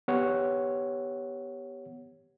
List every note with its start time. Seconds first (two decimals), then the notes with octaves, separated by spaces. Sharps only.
0.08 B3 G4 C#5 F#5